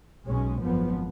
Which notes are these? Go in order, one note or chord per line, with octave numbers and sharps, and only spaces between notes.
B1 B2 G#3 C#4
G#1 F#2 F3 B3